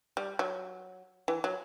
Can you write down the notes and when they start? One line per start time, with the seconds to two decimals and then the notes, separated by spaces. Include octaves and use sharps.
0.17 G3
0.39 F#3
1.28 E3
1.44 F#3